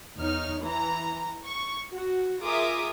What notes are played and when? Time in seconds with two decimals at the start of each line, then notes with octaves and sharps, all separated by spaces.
0.19 E2 D#4 C#5 F6
0.62 E3 A#5
1.44 C#6
1.91 F#4
2.42 F4 G#4 A#4 E5 D6 D#6